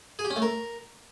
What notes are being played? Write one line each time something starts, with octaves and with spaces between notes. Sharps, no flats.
G#4
G4
C#4
A3
A#4